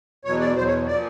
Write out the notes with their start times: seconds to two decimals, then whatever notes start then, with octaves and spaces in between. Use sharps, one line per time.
0.25 E2 B2 F#3 C#5
0.40 D5
0.56 E2 B2 F#3 C5
0.66 C#5
0.87 A#2 F3 D5